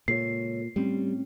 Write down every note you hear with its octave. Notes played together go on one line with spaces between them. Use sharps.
C#2 A#2 A4 C#5 C7
A2 G3 C4 C#4